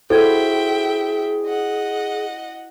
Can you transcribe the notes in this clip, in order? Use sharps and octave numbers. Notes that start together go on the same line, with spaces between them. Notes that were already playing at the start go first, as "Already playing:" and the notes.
E4 F#4 G#4 A4 C5 D5 E5 G5
D#5 F#5